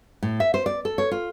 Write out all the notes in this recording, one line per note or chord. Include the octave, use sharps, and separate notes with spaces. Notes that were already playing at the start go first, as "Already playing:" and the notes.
A2
E5
C5
D5
A4
C#5
F4